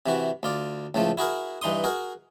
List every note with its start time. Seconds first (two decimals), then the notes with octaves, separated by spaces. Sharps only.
0.06 C3 E3 F#4
0.43 D2 F4 D5
0.94 C#2 A2 F3 A3
1.17 E4 F#4 G#4 A#4
1.62 G2 E3 D#4 C6 D#6
1.84 F#4 G#4 A#4